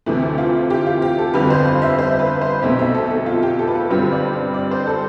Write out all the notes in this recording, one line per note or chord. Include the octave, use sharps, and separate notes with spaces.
D2 C3 E3 A3
F4
G4
F4
G4
A4
G1 F2 D3 G3 B4
C5
F5
E5
C5
B4
C5
B1 B2 A3 C4 E5
E5
A4
A4
F4
G4
A4
B4
A4
G2 D3 G3 C4 B4
D5
D5
C5
A4